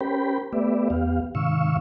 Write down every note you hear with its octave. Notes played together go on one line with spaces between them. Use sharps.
C#4 G4 A#4 C5 G5 B5
A3 B3 G4 B4 D5 E5
E2 B3 G4 F5
G#2 C3 D#3 F5 C#6 E6